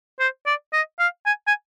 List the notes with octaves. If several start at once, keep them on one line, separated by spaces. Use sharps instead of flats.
C5
D5
D#5
F5
G#5
G#5